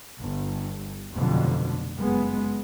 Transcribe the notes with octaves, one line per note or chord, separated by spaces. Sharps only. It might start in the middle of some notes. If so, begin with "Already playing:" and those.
G1
F1 F2 B2 D3 F#3
F#1 G#3 B3